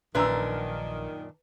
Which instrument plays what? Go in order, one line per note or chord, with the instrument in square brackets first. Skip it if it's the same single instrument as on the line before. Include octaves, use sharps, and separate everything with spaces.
[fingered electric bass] A#1 [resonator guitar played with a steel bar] F#2 A#2 D4 [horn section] D#3 [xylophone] B4 A#5 E6